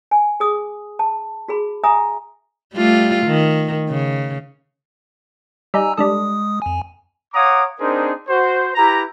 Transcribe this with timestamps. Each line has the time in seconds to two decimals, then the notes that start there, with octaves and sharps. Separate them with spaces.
0.11 G#5
0.40 G#4 D#6
0.99 A5
1.48 F#4 G#4 B5
1.84 E5 G#5 A#5 D#6
2.74 G3 A3 F4
3.27 D#3
3.89 C#3
5.74 G3 D#4 G#5 A#5 E6
5.97 G3 G#3 D4 A4 D#6
6.62 F2 G#5
7.34 C#5 F5 F#5 A#5 D6 D#6
7.80 C4 D4 D#4 G#4 A#4 C5
8.29 F#4 C5
8.75 E4 G4 B4 A#5